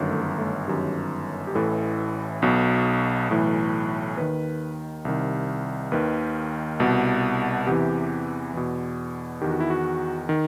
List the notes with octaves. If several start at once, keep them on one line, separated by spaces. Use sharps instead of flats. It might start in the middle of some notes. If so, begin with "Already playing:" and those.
Already playing: G1 F#2 D#3
A3
A3
G1 F#2 D#3 G4
G4
A1 A2 E3 A4
B1 B2
B1 A2 E3
D#2 D#3 B4
C2 C3 D#3
D#2 D#3 B4
C2 B2
E2 C3 E3 G4
E2 B2
E2 D#3 G4
F#4
E4
F#4
D#3